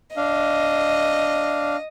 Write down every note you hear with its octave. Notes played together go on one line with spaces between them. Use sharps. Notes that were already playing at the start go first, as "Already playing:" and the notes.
D4 D#5 F5